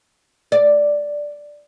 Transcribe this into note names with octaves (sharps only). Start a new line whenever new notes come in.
D5